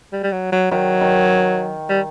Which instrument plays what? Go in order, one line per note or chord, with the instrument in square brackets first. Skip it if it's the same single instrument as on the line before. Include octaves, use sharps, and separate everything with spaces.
[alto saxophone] G3
G3
F#3
F#3
[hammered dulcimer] D#3 [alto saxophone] F#3
[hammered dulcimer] D#3
[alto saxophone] G3